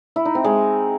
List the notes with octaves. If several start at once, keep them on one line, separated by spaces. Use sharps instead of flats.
E4
D#4
C4
G#3